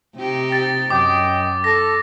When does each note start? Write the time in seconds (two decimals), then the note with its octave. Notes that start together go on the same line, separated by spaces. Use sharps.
0.16 C3 D#4 G4
0.52 A6
0.90 F#2 D#5 G5 D6
1.64 A4 A#6